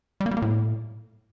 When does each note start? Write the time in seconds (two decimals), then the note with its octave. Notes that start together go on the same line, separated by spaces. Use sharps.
0.20 G3
0.26 A#3
0.31 G3
0.37 A#3
0.42 A2